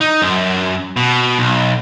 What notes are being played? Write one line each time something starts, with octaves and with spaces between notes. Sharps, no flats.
D#4
F#2
B2
B1